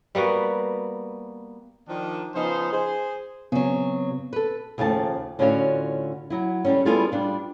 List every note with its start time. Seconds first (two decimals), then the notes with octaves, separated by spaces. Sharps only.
0.15 G3 A#3 B3 F#4
1.88 D#3 F3 D4
2.35 C#3 F3 B3 D#4 C5
2.72 G#4 C5
3.52 C#3 F#3 B3 C4
4.33 A4 B4
4.78 D#2 C#3 F3 A3 A5
5.39 A2 D3 C#4 F4 F#4 F5
6.30 F#3 E4
6.65 D3 G3 C#4
6.85 G3 B3 E4 F4 G#4 A4
7.12 G3 D4 F4